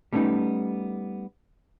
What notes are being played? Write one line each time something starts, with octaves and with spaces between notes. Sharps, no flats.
G3 A3 B3 C#4 D#4